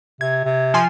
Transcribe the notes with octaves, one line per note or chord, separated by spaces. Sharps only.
C3 G#6
C3
F3 G#5 C6